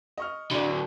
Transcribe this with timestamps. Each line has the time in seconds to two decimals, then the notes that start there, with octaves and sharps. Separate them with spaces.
0.18 D#5 C#6 F6
0.51 D3 F#3 D5 B5
0.68 D4